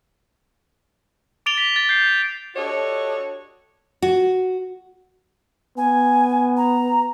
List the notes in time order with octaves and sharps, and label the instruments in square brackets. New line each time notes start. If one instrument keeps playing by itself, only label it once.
[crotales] D6 A6 D7 F7 G7
B6
A6
G6 C7
[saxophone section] D4 F#4 G4 A4 C#5 D#5
[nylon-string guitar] F#4
[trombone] B3 [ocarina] G#5
[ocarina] A#5